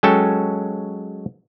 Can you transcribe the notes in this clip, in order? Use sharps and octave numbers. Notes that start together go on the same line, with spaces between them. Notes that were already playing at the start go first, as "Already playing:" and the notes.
F#3 G#3 C#4 A4 G5 A5